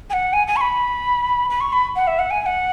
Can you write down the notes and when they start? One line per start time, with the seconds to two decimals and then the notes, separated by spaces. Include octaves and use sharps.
0.10 G#5
0.13 F#5
0.33 G#5
0.47 G#5
0.56 C#6
0.61 B5
1.50 B5
1.61 C#6
1.73 B5
1.96 F#5
2.07 E5
2.19 F#5
2.31 G#5
2.42 G#5
2.46 F#5